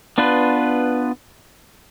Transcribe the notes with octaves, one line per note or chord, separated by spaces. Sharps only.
B3 D4 F4 B4